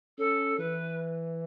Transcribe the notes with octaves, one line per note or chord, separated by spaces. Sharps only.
C#4 A4
E3 B4